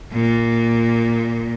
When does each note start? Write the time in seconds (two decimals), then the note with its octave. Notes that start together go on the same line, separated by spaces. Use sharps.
0.12 A#2